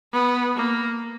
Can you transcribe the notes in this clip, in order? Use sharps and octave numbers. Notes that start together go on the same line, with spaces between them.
B3
A#3